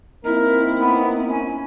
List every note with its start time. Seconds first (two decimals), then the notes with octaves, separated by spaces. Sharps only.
0.25 A#3 C4 D#4 E4 A#4
0.78 B3
1.28 C#4